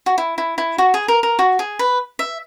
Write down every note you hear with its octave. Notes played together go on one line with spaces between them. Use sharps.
F#4
E4
E4
E4
F#4
G#4
A#4
A#4
F#4
G#4
B4
E5